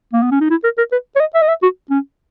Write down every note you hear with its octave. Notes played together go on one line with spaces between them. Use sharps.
A#3
B3
C#4
D#4
E4
A#4
A#4
B4
C#5
D#5
E5
D#5
E5
F#4
C#4